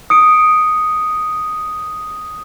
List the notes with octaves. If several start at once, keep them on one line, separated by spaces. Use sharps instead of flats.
D#6 C#7 D7